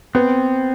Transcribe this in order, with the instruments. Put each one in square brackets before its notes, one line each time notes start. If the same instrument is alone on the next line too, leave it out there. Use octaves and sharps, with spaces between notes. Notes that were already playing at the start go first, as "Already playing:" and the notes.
[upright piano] B3 [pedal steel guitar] C4